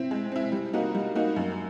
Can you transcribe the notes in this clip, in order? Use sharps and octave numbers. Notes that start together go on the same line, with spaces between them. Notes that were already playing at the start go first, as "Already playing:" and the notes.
Already playing: C4 E4
G#3
C4 E4
G3
A#3 D#4 F#4
G3
A#3 D#4 F#4
F#2